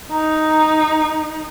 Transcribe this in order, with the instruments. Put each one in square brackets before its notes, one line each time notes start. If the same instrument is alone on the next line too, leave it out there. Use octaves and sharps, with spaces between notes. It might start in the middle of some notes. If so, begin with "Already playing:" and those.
[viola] D#4 [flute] A#5